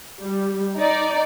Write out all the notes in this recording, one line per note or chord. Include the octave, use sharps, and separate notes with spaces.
G3
D#4 D5